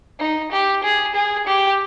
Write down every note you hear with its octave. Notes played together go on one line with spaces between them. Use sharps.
D#4
G4
G#4
G#4
G4